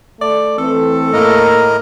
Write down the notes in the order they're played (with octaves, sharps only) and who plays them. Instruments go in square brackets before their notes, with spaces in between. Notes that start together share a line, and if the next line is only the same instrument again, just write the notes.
[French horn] A3 [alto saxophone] D5
[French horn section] E3 C4 [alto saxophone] A4
[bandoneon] A2 A#4 D#5 [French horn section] A#3